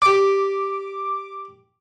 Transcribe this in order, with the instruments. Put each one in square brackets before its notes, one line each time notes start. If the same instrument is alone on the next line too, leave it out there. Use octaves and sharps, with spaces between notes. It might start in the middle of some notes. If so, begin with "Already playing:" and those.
[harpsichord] G4 D5 [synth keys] D6